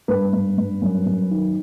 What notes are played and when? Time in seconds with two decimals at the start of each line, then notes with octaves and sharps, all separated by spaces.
0.08 G2 B4
0.33 G2
0.58 G2
0.82 F#2
1.06 F#2
1.31 D#3